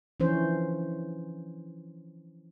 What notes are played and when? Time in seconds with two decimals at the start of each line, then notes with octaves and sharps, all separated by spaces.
0.20 E3 F3 C#4 D4 C5